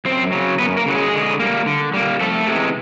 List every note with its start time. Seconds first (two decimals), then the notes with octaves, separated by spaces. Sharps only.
0.05 F#2 C4 C5
0.32 C#3 F#3
0.59 F#2 B3 B4
0.77 A#3 A#4
0.86 C#3 F#3
0.95 G#3 G#4
1.13 D3
1.39 G3 A#3
1.66 D3
1.94 G3 A#3
2.20 F2 A3 A4
2.47 C3 E3 G#3